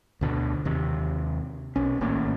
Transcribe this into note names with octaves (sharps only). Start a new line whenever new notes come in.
D2 B2 D3
D#2 C3
B1 C#4
G#1 A2 A#3 C#4